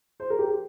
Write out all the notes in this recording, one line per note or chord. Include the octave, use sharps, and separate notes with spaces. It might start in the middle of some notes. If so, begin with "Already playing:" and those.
C5
A#4
G4
G4